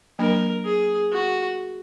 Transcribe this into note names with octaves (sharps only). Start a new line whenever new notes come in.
F#3 A#3 D4 A#4
G#4
F#4